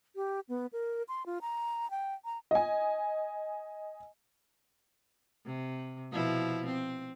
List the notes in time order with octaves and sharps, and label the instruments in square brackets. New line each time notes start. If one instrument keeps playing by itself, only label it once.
[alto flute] G4
B3
A#4
C6
F4
A#5
G5
A#5
[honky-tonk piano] D#5 G#5
[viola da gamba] C3
B2 F3 E4
C4